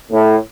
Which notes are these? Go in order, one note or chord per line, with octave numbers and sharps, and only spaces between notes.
A2